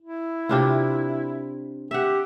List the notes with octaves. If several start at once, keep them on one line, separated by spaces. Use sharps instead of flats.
E4
C3 D4 F4
G4 E5 F#5